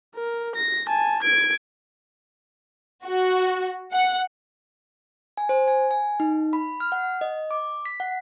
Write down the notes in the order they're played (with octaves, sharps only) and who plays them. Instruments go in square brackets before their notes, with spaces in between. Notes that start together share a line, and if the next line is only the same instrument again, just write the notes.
[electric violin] A#4
A#6
G#5 A5
G#6 D7
[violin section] F#4
F#5
[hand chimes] G#5
C5
G#5
G#5
D#4
B5
F6
F#5
D#5
D6
B6
F#5